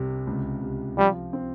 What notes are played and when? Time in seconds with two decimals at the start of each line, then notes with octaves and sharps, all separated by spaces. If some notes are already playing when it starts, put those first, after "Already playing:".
Already playing: C2 C3
0.27 C#2
0.62 C3
0.97 F3 G3
1.33 C4